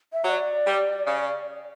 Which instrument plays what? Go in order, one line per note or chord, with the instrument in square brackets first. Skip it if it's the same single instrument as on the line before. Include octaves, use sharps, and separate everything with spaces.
[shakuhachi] E5
[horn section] F#3 [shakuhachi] E5
[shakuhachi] D5
[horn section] G3
C#3